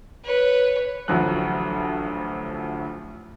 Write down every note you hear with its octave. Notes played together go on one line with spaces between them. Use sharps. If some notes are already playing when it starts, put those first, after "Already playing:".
B4 C#5
A1 D2 F3 F#3 F#6